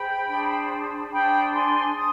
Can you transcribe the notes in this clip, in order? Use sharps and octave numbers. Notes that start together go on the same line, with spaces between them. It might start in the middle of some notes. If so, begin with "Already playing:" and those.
Already playing: G#4 C5 G5 B5
D4 G#4 C5
D4 G#4 C5 G5 B5
B5
G#5 C6
D4 C6 D#6